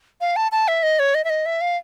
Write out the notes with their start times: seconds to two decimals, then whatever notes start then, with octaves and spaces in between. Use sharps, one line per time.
0.21 F5
0.36 A5
0.52 A5
0.68 E5
0.83 D#5
0.99 C#5
1.15 D#5
1.24 E5
1.30 D#5
1.46 E5
1.61 F5